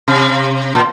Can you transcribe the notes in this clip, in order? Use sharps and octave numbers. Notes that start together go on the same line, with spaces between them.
C3
A#2